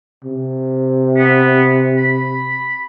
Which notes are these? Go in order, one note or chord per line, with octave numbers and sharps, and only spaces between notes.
C3
B3
B5